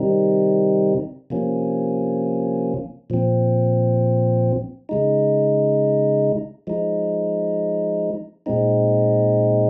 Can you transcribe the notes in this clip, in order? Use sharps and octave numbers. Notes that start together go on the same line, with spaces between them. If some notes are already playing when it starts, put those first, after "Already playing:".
Already playing: C3 D#3 G3 C4 D#4
C3 F3 A#3 C#4
A#2 F3 C4
C#3 G#3 D#4
F3 G#3 D#4
A#2 G#3 C4 D#4